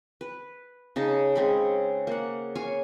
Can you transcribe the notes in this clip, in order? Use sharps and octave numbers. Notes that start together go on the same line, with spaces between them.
B4
C#3 D#4 A5
C#3 G#3 C4 B5
A#3 F#5
C#5 F5 G#5